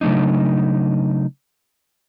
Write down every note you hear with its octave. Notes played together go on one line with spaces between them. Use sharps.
C#3 F#3 A3 D4 D#4